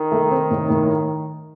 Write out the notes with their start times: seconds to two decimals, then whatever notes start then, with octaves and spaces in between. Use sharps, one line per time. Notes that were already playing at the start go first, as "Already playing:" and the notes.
Already playing: D#3
0.12 A3
0.31 C4
0.51 A2
0.70 A2